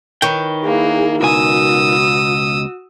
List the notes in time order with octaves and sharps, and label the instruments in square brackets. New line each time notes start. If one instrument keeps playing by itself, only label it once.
[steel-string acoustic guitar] D#3 [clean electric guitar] B4 C#5 G5
[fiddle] A#3 [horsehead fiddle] E4 G#4
[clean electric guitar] C#2 B2 G#5 [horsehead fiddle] F#4 [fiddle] D#6 E6